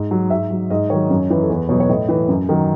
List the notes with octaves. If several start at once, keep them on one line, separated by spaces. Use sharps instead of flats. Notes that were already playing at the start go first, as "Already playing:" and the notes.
Already playing: G#2
F#3
G#2 E5
F#3
G#2 D#5
D#3 F#3 C#5
F#2
E3
A4
E2 B4
B2 F#3 C#5
C#5
A2 D#5
E3
F#2
D#3 F#3